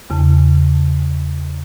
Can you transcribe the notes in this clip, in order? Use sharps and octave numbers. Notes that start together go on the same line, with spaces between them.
E2 C#3 A5